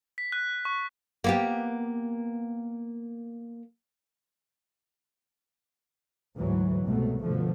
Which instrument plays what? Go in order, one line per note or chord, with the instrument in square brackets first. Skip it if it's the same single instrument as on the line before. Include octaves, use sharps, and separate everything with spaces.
[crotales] B6
F#6
C#6
[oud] A#3 B3 G4
[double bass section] D2 G#2 E3 F#3
C2 G#2 B2 F#3 A3
G2 B2 D3 F3 A3